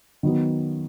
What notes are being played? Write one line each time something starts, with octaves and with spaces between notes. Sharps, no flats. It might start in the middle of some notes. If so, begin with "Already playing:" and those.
D#3 F#3 B3